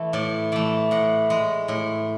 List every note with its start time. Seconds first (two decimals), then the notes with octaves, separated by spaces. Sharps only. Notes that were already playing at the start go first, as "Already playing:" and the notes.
Already playing: E3 A3
0.13 A2 D5
0.52 E3 A3 D5
0.91 A2 F#5
1.30 G#3
1.68 A2